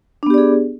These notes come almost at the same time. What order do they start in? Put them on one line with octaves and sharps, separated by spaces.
D4 B3 G4 D5 G#4